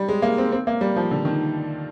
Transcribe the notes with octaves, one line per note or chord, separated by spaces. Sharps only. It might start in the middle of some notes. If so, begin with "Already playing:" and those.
Already playing: G3
G#3
A#3
C4
C4
A#3
G3
F3
D3
D#3